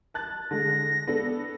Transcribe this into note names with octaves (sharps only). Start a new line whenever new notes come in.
A5 F#6 A6
D3 G#3 A#6
B3 D4 A4